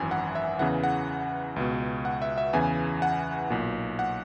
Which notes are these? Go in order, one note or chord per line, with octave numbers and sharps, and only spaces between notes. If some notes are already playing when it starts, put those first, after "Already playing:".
Already playing: G#1 F#2 E3 G#5
F#5
E5
E2 C#3 E3 F#5
F#5
C#2 B2
F#5
E5
E5
E2 C#3 E3 G#5
F#5
B1 A#2
F#5